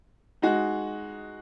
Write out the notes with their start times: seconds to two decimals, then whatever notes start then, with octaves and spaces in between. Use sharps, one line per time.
0.42 G#3 D#4 F#4